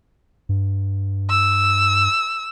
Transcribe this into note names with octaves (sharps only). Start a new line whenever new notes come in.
G2
E6